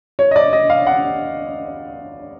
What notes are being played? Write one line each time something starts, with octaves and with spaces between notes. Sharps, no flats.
C#5
D#5
D5
D#5
F5
F#5